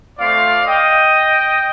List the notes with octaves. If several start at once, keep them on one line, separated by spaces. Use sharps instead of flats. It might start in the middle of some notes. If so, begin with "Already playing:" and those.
A3 C4 F4 D5 F5
D#5 G5